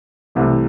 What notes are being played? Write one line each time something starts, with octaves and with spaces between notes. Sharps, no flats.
C2 C3 E3 A3